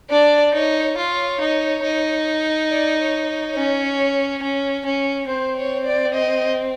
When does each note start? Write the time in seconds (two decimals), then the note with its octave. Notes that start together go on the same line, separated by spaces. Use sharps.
0.10 D4 D5
0.54 D#4 C#5
0.97 F4 C#5
1.40 D#4
1.83 D#4
2.70 D5
2.99 C#5
3.27 C#5
3.55 C#4
4.42 C#4
4.86 C#4
5.29 C4 C5
5.57 C#5
5.86 D5
6.16 D#5